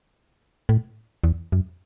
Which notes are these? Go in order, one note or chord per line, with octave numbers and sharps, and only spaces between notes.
A2
E2
F#2